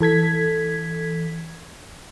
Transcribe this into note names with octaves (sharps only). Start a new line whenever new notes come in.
E3 A4 G#6 B6